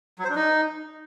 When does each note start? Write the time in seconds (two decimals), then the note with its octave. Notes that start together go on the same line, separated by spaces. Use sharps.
0.19 F#3
0.24 C5
0.30 D4
0.36 D#4